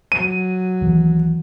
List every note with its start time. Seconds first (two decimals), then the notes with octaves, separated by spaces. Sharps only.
0.12 F#3 D#7
0.81 D2 D#3 E3